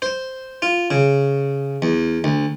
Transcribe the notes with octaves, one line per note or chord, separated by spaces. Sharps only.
C5
F4
C#3
E2
D2